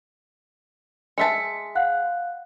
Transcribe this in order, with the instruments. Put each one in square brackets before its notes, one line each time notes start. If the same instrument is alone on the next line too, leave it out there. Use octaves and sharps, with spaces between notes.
[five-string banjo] G#3 E5 A5 [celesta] B6 C#7
[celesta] F5 F#5 F#6